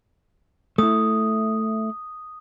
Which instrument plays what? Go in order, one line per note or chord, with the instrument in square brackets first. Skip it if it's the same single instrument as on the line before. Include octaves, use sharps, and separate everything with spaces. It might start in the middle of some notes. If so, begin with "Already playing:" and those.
[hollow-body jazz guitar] A3 E4 [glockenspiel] D#6